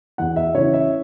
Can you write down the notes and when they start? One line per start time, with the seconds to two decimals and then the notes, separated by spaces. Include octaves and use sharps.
0.18 E2 F#5
0.36 E5
0.54 C#3 E3 C#5
0.73 E5